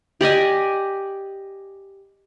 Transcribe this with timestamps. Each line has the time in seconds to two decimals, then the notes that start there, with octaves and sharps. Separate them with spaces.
0.21 G4 D5 D#5 G#5